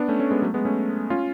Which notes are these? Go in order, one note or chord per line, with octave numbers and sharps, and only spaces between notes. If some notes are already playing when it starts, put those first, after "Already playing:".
Already playing: B3 D4
A3 C#4
A3 C#4
G#3 B3
F#3 A3
G#3 B3
A3 C#4
C#4 F4